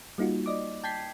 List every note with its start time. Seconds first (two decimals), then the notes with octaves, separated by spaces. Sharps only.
0.18 G3 A#3 D#4 F4 F#4
0.46 D5 D#5 D6
0.83 G5 A5 G6 G#6 B6 C7